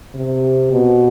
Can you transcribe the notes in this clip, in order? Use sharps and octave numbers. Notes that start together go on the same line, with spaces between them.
C3
B2